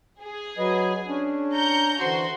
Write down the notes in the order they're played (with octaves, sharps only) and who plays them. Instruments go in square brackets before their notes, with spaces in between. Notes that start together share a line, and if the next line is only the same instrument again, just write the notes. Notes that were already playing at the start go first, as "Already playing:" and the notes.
[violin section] G#4
[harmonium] F#3 B4 D#5
C#4 D4
[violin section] A#5 G6 C#7
[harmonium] D3 E3 C5 [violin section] F#4 C6